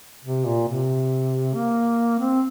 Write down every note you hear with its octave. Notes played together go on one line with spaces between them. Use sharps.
C3
A#2
C3
A#3
C4